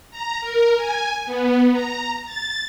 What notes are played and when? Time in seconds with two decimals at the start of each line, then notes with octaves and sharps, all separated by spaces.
0.11 A#5
0.41 A#4
0.77 G#5
1.25 B3
1.72 A#5
2.26 A6